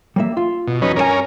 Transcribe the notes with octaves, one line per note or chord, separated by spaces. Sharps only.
G3 A#3 E5
F4
B2
E2 F#3 C#4 D#4 B4
G2 C#4 G4 A#4 G#5